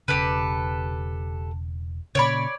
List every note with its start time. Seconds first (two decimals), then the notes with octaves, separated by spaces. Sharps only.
0.08 E1 C#3 G4 A4 B4
2.15 A#2 C#3 C#5 D5 B5